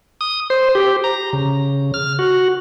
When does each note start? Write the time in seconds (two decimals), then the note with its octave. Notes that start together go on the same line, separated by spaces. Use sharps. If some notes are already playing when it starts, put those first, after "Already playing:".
0.21 D#6
0.50 C5
0.75 G4
1.04 A#5
1.33 C#3
1.94 F6
2.19 F#4